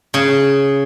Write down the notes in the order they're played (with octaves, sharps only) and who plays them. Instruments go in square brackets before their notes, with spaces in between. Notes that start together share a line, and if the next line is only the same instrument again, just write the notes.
[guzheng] C#3